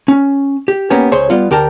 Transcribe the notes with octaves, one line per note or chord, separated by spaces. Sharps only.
C#4
G4
A#3 B3 C#4 G4 G#5
C#2 G#4 C5 C#5 C6
G3 B3 F4
D2 G4 A#4 A5